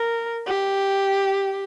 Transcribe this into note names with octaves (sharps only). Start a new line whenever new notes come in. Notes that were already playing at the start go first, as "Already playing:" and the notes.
Already playing: A#4
G4